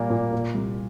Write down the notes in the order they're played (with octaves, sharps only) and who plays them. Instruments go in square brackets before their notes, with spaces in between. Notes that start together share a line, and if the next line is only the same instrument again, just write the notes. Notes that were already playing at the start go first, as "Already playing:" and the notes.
Already playing: [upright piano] A#2 G3 [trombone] A#3
[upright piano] A#2
A#2
C2